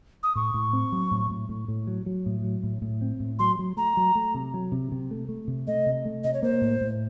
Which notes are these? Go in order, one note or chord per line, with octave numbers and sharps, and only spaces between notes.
D#6
A2 C#6
A2
C4
F#3
A2
A2
A2
A2
F#3
F#3
A2
F#3
A2
A2
C4
A2
F#3 C6
F#3
A3 A#5
F#3
A3
C3
F#3
C3
C3
A3
A3
C3
A3 D#5
C3
A3
C3 D#5
C#5
A#3 C5
A2
A2